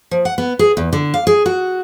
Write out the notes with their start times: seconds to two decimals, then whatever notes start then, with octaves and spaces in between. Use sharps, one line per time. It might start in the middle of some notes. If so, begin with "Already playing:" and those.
0.11 F3
0.25 F#5
0.38 B3
0.59 G#4
0.77 E2
0.93 D3
1.14 F5
1.27 G#4
1.46 F#4